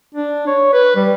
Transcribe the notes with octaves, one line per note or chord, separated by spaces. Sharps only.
D4
C#5
B4
G3